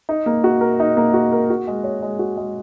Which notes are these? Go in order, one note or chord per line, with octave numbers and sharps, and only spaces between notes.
D#4
A#3
F#4
A#4
D#4
A#3
F#4
A#4
F#4
G#3
C#5
G#3
F#4
G#3